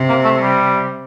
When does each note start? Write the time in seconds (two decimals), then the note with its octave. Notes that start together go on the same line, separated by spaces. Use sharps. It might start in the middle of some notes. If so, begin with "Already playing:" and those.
Already playing: C3
0.09 A#3
0.24 A3
0.40 G3